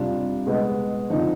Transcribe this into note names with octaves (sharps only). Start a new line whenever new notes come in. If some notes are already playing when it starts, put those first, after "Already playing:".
Already playing: C3 G3 D4 F4
B2 G#3 B3
D3 F3 C4 D#4